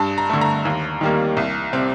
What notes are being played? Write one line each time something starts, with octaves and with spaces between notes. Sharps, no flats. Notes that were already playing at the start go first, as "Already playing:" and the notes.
Already playing: G2 A5
A#5
D3 A3
A#5
D#2
D#3 G3 A#3
C2
C3 G3 C4